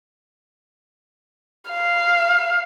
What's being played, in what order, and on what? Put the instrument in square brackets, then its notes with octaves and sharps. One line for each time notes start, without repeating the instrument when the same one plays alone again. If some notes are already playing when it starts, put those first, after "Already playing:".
[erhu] F5